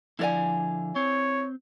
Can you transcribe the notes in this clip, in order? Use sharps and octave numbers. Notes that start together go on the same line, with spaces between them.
D3 F3 E4 D5 F5 G#5
C4 C#5